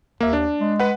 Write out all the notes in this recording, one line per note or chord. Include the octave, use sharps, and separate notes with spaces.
D#2 A#3 E5
D4
G#3
B4 F#5